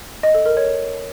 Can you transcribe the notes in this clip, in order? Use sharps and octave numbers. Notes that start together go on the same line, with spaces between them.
D#5
A4
A#4
C#5